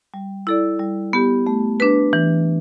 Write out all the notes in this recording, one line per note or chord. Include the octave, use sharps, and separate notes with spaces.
G3
E4 A4 D5
G3
B3 G4
A3
D4 B4
E3